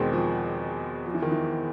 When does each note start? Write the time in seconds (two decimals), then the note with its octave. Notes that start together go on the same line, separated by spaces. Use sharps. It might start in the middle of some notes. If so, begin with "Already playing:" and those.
Already playing: E2 B2 D#3 G#3 C4
0.13 F3
1.06 F3
1.14 E3
1.22 D#3
1.32 E3